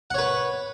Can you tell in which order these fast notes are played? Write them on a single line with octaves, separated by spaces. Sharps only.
F#5 C#5 B4